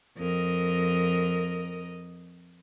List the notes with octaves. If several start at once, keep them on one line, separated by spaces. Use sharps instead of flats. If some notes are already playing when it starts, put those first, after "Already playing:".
F2 A#4 D#5